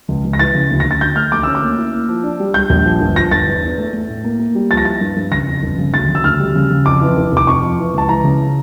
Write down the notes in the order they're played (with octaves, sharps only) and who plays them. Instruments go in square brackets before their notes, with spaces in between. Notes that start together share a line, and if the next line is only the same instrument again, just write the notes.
[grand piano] C#2
C#2
A#6
E3 A6
C#3
D2
A#6
D2
A6
D3 G6
A3 F6
D2 D6
C#4 E6
D6
A#3
E4
A#3
F3
D4
G3
G3 G6
A#1
F3
G1
F3 A#6
G1 A6
E2
E2
A3
A3
A2
A#3
A#3
G3
F3 A6
A#6
E4 A6
G2
G2
C#3 A#6
F2
G1
C#3
D2 A6
C#3
E6
D2 F6
G3
C#3
C#3
F2 D6
E3
F1
F1 D6
F2 C#6
F3
E3
C#2 A5
E3 A#5
C#3